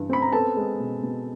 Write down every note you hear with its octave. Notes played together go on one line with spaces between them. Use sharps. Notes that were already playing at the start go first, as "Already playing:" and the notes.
Already playing: G2 E3
C4 B5
A#5
B3 A4 A5
G#3
B2
B2